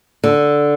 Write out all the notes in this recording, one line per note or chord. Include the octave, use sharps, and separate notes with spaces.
D3